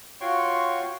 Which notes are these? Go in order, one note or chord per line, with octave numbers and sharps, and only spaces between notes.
F4 F#4 C#5 G5 C6 C#6